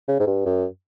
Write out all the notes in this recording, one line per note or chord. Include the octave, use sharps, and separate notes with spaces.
C#3
G#2
G2
F#2